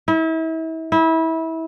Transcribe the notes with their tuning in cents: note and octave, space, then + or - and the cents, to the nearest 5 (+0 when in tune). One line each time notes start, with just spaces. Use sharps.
E4 -35
E4 -25